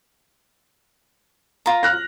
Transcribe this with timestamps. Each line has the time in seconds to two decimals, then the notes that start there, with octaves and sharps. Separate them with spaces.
1.66 F4 A#5
1.83 F6 F#6 A#6